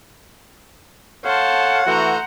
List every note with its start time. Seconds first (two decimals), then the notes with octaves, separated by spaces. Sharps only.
1.26 A4 C5 C#5 F5 F#5 A5
1.87 E3 A3 F#4 C5 A#5